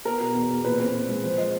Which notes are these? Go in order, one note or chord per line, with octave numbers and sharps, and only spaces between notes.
B3 A#4
B2
E2
E2
A#2 B4
C4
A#2
G#3
F3 C5
F3 D#5